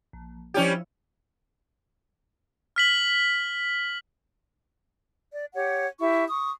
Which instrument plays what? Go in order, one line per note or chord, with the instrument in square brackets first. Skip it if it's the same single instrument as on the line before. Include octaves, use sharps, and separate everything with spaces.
[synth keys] A#1
[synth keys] F3 E4 C#5 [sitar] G3 C#4 G4
[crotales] F6 B6 F#7
[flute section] D5
G4 C#5 F#5
E4 G4 E5 C#6
C#6 D#6